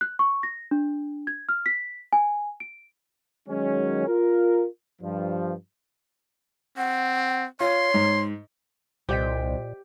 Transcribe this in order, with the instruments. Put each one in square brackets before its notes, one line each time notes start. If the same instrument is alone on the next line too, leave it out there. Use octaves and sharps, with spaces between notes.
[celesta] F#6
C#6
A#6
D4
G#6
F6
B6
G#5
D7
[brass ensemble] D#3 F#3 G#3 C#4
F4 A#4
G2 F3
[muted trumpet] C4 [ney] F#5
[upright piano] F4 [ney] C#5 [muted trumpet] C6
[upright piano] G#2
[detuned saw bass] C2 [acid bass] A#2 [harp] G4 G5 B6 [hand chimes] C5 D5 D#5